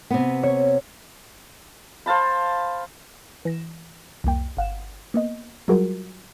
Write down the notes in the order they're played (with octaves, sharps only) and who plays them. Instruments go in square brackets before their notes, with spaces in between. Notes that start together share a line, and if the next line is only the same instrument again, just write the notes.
[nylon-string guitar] C3 B3
[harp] C#5
[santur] C5 F5 A5 B5
[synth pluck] E3 A#6 E7
C2 F2 A#3 G5
G1 F5 F#5 E7
A#3 B3 D#5
F#3 G3 F4 F#4 G#4 A#4